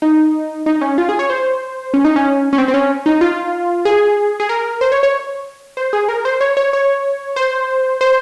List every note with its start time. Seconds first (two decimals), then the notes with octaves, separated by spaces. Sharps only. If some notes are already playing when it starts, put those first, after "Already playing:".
0.02 D#4
0.66 D#4
0.81 C#4
0.98 F4
1.09 G#4
1.19 C#5
1.30 C5
1.94 C#4
2.05 D#4
2.16 C#4
2.53 C#4
2.58 C4
2.68 C4
2.74 C#4
3.06 D#4
3.21 F4
3.85 G#4
4.40 G#4
4.49 A#4
4.81 C5
4.92 C#5
5.03 C#5
5.77 C5
5.93 G#4
6.09 A#4
6.25 C5
6.41 C#5
6.57 C#5
6.73 C#5
7.36 C5
8.01 C5